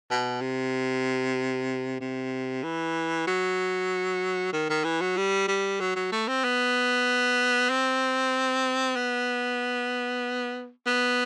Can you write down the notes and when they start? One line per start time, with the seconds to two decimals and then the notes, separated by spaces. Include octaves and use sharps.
0.11 B2
0.41 C3
2.00 C3
2.63 E3
3.27 F#3
4.53 D#3
4.70 D#3
4.84 E3
5.01 F#3
5.17 G3
5.48 G3
5.80 F#3
5.96 F#3
6.12 A3
6.28 C4
6.44 B3
7.70 C4
8.96 B3
10.86 B3